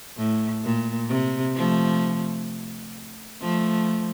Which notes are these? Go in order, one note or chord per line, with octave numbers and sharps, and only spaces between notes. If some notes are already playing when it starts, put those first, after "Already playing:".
A2
A#2
C3
F3 A3
F3 A3